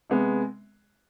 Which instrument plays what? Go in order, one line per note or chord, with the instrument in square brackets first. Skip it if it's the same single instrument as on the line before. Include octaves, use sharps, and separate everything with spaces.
[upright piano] C3 G#3 B3